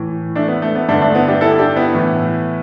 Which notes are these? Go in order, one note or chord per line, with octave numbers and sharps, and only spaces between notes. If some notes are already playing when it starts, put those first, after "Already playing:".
Already playing: A2 E3
A3 D4
B3
A3
B3
G2 D3 A3 D4
A3 D4
B3 E4
D4 G4
E4 A4
D4 G4
B3 E4
A2 E3